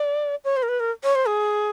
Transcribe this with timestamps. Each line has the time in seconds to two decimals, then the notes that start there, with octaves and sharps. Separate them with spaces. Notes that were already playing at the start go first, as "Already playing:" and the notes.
Already playing: D5
0.44 C#5
0.57 C5
0.63 A#4
0.69 B4
0.80 A#4
1.03 C#5
1.15 C5
1.27 G#4